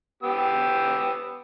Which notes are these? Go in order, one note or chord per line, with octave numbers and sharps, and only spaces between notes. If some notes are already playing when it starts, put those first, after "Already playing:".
B3 G4 E6